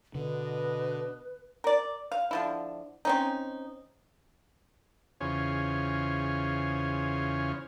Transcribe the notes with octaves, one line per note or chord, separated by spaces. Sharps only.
B2 D3 B4 D#5
A#4 D5
F5
D3 F3 E4
C4 C#4 D#4
E2 C#3 F4 G#4 C5 C#5